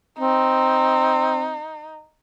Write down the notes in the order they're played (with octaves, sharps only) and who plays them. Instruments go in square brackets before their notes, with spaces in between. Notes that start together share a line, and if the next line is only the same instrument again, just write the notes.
[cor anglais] C4 [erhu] D#4